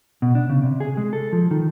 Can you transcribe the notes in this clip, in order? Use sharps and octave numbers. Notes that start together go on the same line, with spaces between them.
B2
D4
C#3
C3
G#4
G#3
A4
F3
D#3